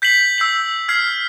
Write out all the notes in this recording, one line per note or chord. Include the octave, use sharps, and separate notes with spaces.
G6 B6 C7 F#7
E6 G6 C7 F#7
F6 G#6 C7